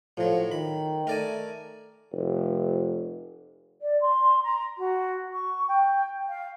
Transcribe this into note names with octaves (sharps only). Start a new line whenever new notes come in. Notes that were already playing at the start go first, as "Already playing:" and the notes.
A2 F3 F#3
D#3 B5
A3 A#4 D5 G#5
F1
D5
C6
A#5
F#4
C#6
G5
F5